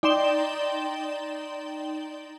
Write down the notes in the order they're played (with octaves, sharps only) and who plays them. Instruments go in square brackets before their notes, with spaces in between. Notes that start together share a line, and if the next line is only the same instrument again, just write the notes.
[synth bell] D#4 D5 G5 C6 E7 G7